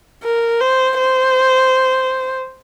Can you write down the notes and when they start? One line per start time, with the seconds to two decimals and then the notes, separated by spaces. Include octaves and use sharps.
0.24 A#4
0.61 C5
0.99 C5